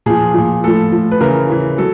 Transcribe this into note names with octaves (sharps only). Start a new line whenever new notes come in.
A#2 F3 G#4
A#2 F3
A2 F3 A4
A2 F3
B4
C#3 E3 A#4
C#3 E3
F#3 A4